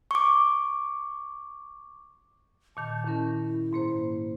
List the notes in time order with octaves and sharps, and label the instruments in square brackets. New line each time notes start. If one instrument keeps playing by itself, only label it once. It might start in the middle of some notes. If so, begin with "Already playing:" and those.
[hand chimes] C#6 D6
[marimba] A#2 D#3 G6 [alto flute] A5
[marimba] D#3 C#4 A#4 [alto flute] E4
[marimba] G#2 A#3 C5